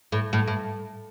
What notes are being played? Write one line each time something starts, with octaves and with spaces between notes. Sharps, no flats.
A2
A2
A2